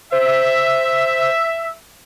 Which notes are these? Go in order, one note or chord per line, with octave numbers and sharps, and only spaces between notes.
C5 E5